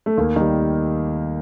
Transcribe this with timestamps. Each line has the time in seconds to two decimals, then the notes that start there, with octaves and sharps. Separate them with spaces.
0.06 A3
0.17 D#2 A#3
0.36 D#3 G3